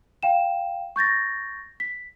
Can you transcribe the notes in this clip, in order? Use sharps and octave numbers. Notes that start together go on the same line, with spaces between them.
F5 G5 E7
C#6 G6 A6 A#6
B6